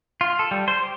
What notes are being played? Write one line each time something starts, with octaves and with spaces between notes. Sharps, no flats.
F4
A4
G3
C5
G4